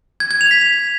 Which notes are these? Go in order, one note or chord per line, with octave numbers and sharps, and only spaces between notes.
G#6
G#6
F7
B6
F7